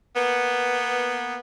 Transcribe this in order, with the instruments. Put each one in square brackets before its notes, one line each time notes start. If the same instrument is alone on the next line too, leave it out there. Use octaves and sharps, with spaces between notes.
[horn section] A#3 B3